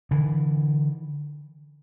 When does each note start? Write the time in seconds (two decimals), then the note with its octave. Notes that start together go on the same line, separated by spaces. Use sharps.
0.11 D3 E3